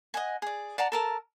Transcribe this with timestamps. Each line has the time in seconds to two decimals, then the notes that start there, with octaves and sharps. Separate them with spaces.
0.14 D#5 F#5 G#5
0.42 G#4 D5
0.78 D5 F#5 A5 A#5
0.92 A4 A#4 A5